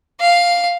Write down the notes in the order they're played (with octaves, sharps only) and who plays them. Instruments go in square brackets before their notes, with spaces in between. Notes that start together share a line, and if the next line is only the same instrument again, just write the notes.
[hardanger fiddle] F5